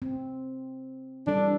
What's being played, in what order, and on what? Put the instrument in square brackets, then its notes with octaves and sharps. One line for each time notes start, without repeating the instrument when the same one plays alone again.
[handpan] C4
[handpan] E3 G3 A4 [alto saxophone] D4